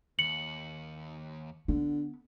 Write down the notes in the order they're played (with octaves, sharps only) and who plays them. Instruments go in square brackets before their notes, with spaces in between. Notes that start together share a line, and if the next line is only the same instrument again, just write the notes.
[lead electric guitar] D#2 [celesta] C#7 F#7
[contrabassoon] D3 [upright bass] B3